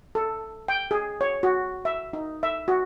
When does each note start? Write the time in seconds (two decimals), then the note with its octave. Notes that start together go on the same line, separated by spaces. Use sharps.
0.15 A4
0.68 G5
0.91 G#4
1.21 C#5
1.43 F#4
1.85 E5
2.13 D#4
2.43 E5
2.68 F#4